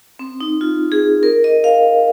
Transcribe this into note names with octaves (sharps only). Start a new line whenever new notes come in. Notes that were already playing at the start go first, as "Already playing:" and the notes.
C4
D#4
F4
G#4
A#4
D#5
F5